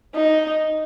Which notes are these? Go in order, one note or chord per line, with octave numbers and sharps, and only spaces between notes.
D#4